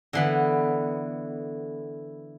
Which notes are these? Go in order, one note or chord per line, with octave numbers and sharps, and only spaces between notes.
D3 E3 B3